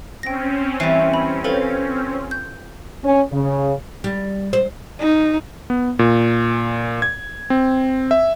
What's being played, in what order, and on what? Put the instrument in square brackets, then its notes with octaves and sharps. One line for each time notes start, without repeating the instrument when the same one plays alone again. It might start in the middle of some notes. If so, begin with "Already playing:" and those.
[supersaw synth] C4 C#4 [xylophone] G5 A#6
[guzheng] E3 G3 [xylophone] C7
[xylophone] B5
[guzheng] F4 [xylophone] A4 B4 C5
[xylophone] G6
[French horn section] C#4
C#3
[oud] G3
C5
[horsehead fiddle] D#4
[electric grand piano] B3
A#2
G#6
C4
E5